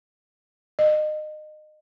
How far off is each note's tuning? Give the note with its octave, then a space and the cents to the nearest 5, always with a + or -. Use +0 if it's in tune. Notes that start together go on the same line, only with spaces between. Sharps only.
D#5 -30